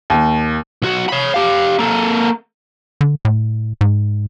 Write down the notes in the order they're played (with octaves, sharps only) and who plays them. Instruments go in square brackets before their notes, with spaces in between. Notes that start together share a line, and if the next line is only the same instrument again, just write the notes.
[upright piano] D#2
[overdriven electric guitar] B1 F#4
C#5 B5
G4 F5
A#3 A4
[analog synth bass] D3
A2
G#2